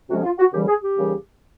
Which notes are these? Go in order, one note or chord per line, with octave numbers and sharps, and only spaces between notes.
D2 C3 F3 G#3 C#4 F#4
F4
F#4
D#2 C#3 E3 G3 G4
G#4
G4
D#2 C#3 E3 G3